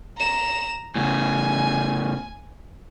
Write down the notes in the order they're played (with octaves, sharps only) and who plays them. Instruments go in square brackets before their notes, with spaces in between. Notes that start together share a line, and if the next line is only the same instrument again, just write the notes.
[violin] A#5 E7
[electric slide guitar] A2 C#3 [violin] G#5